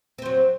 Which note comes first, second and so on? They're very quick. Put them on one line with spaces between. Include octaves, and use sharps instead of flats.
C4 C5 F#3